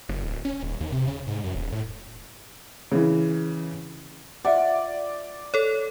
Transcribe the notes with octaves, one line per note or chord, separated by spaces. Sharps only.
F#1
D1
C#4
D#1
D#2
C3
C#3
G#2
F#2
D#1
A2
C#3 E3
F4 D5 E5 F#5
A4 C#5